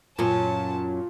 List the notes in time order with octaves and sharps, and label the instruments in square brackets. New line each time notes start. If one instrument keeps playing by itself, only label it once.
[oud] F#2 F#3 C#4 [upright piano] A#2 [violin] A5